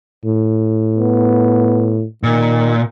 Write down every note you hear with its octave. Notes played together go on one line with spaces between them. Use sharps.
A2
B3
A#2 D#3